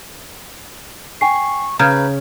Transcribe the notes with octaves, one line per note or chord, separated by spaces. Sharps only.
G5 G#5 C#6 C7
C#3 B4 A#5 G6